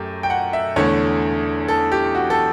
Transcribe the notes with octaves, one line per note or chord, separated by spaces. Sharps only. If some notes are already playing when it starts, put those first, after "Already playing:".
Already playing: F#2 A3 G4
G5
F#5
E5
E2 D3 A3 C#5
A4
G4
F#4
A4